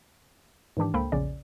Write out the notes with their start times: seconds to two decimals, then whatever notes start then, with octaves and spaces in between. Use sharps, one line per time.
0.77 G#2 D#3 E3 D4 G4
0.94 C#2 A#3 A4 C5 G5 B5
1.12 A#1 E2 C#3 C#4 D5